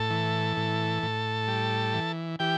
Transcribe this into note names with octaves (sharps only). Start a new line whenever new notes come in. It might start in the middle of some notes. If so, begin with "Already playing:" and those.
Already playing: A2 A4 A5
E3
A2
A2
G3
E3
E3 G4 G5